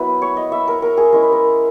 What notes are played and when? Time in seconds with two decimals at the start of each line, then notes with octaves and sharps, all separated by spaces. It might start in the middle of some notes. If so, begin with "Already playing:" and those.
Already playing: F#3 B3 E4 B4
0.22 C#5
0.37 D#5
0.52 E5
0.68 A#4
0.82 A#4
0.97 G#4
1.12 G#3 C#4 E4 A#4
1.22 B4
1.32 A#4